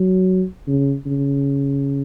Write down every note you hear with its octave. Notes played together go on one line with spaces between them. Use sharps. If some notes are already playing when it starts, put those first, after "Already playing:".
Already playing: F#3
C#3
C#3